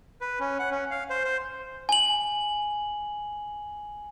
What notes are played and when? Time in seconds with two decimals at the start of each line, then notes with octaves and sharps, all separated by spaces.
0.21 B4
0.40 C#4
0.59 F#5
0.71 C#4
0.91 F5
1.10 C5
1.24 C5
1.89 G#5 F#7